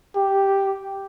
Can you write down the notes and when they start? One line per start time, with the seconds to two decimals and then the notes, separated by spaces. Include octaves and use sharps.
0.16 G4